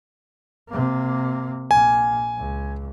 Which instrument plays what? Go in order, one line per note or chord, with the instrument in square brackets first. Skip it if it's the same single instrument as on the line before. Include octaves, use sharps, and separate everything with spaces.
[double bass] C3 A#3
[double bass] A#1 A#3 [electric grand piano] G#5
[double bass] C#2